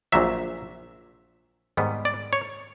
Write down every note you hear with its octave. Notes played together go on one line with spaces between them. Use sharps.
A#1 A#2 F#3 E5
G#2 D#3 G3 B3
D5
C#5